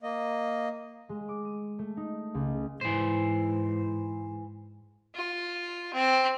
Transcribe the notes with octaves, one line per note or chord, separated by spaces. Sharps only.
A#3 D#5
G#3
D6
D#7
A3
D#4
C#2
G#2 E3 C5
F4
C4